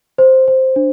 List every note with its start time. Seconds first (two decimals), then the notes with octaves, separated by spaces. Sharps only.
0.18 C5
0.48 C5
0.76 D4